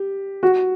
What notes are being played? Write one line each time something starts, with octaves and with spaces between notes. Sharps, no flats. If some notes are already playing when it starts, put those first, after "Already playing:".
Already playing: G4
F#4